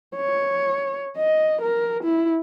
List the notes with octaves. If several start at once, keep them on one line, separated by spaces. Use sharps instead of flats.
C#5
D#5
A#4
E4